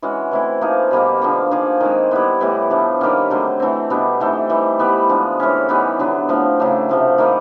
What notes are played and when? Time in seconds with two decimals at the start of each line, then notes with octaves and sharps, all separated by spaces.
0.02 E3 G#3 C#4 F#4
0.31 E3 A3 C4 E4
0.61 F3 A#3 D#4 G#4
0.91 B2 G3 A#3 D#4
1.22 D3 F3 A#3
1.51 F3 A#3 D#4 G#4
1.80 D#3 G#3 C4
2.11 G3 B3 E4
2.40 A2 E3 G3 B3
2.70 F3 A3 D4
3.01 D#3 G3 A#3 C#4
3.30 D3 F#3 A3 C4
3.60 E3 A3 C4
3.90 B2 G3 B3 D4
4.20 E3 A3 C4 D#4
4.50 E3 G3 C4 D#4
4.79 E3 G3 B3
5.09 D3 F3 G#3
5.40 A2 E3 G#3 C#4
5.69 E3 G3 B3 D#4
5.99 D3 F#3 B3
6.29 A2 F3 A3 C4
6.59 C#3 F#3 A3 D4
6.89 C3 F3 A3
7.18 D#3 G3 A#3 D#4